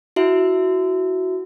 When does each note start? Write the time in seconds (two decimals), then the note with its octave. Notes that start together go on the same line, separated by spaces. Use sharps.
0.16 E4 F#4 E5